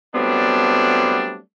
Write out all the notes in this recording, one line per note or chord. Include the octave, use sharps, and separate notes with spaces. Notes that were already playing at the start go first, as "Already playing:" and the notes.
F#3 G3 A3 B3 C4 D4